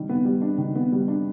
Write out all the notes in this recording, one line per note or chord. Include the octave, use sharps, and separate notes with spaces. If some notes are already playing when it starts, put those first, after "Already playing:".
Already playing: D#3 G3 D4
B3
G3
D4
D#3
B3
G3
D4